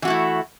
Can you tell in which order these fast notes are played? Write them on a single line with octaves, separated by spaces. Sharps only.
E3 F#4 A3 E4